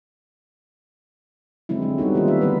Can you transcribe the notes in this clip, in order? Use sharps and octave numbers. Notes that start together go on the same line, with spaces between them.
D3 F#3 G#3 C4 E4
F#3
G3 B3 D#4 F#4
D#3 A#3 C4 F4
E5
D3 F#3 G#3 B3 B4